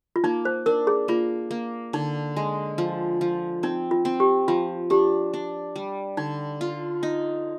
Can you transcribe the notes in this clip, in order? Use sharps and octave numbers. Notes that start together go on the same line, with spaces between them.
F4
A#3 D#4
C5
D4 A#4
G#4
A#3 F4
A#3
D3 D#4
G#3
F3
F3
C4 D#4
F4
C4
G4
F3 F4
D4 G4
D4
G3
D3 D#4
F4
D#4